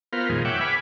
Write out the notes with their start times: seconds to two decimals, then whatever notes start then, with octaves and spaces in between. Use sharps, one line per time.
0.13 B3 F4 A#4 C5 F5
0.29 F2 A#2 D#3 G#3
0.45 C#5 E5 F#5 G5 D6
0.61 B4 G#5 B5 D6 F6